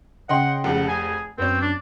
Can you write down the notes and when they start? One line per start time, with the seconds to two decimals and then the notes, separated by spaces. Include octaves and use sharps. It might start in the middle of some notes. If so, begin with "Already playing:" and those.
0.29 C#3 D#5 F#5 G5 C6
0.64 F1 F2 G#3 F#5
0.88 G#4 G#5
1.38 F#2 B3 C4 C#5
1.61 D4